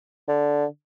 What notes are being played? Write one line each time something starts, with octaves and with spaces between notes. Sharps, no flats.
D3